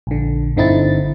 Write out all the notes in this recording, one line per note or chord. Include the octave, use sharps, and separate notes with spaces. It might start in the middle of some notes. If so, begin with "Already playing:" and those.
A#1 D3
G1 D3 C4 D#4 E4 A6